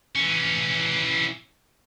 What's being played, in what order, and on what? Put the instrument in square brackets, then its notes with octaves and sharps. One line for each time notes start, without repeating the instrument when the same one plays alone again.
[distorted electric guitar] E3 C#4